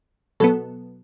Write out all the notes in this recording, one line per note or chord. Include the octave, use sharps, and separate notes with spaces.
B2 F#3 B3 A4